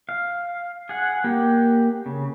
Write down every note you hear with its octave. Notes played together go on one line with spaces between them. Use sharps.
F5
G#4 F#5
A#3 G4
C#3